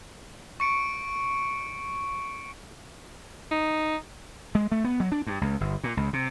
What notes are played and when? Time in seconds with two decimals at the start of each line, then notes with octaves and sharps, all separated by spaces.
0.60 C#6 C#7 D7
3.51 D#4
4.55 G#3
4.72 A3
4.84 B3
5.00 F#3
5.12 D4
5.27 G2
5.41 C#2
5.61 G1
5.84 A#2
5.97 C#2
6.13 C3